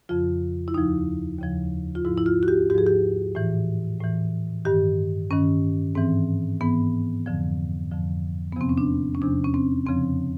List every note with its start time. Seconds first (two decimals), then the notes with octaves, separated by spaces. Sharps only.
0.09 F2 C#3 F3 F4
0.68 E4
0.74 D#2 C#3 F3 D#4
1.39 D#2 C#3 F3
1.95 F4
2.05 G#2 F3 E4
2.17 E4
2.26 F4
2.43 F#4
2.48 G4
2.70 G#2 G4
2.74 F3 G#4
2.87 G4
3.35 A2 E3
4.00 A2 E3
4.65 G2 D#3 G4
5.31 G2 D#3 C#4
5.95 G#2 E3 C4
6.61 G#2 E3 B3
7.26 F2 D3 F3
7.91 F2 D3 F3
8.52 B3
8.56 E2 C3 F3 C4
8.69 C#4
8.78 D4
9.15 C#4
9.22 E2 C3 F3 D4
9.44 C#4
9.54 C4
9.86 F2 C#3 F3 C4